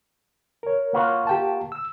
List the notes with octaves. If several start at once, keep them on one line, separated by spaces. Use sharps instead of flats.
A#4 C#5
A#3 F4 F#4
G4 G5 A5
E6